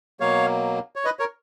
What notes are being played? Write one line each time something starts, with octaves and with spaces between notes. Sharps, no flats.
B2 F#3 A#3 C#5 F5
C#5
B4 D#5
A#4 C#5